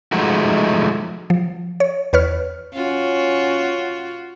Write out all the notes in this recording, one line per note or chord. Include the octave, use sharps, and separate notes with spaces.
F3 G#3 A3 D#4 F#4
F3
C#5
E2 B4 C#5 F6
C#4 F4 F#4